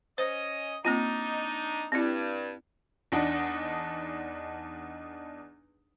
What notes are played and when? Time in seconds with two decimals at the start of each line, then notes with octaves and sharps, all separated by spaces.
0.18 C#4 C5 D#5
0.85 A#3 C4 D4 D#4 F4
1.92 G2 C4 E4
3.12 E2 D4 D#4 F#5